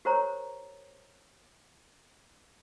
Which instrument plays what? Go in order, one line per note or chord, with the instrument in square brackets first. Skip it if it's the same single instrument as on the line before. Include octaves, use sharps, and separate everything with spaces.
[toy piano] G4 A#4 C5 C#5 A#5